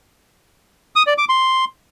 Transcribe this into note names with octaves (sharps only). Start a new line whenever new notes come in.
D#6
D5
D6
C6